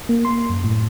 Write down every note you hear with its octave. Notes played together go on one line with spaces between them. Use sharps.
A#3
C6
F#2
A2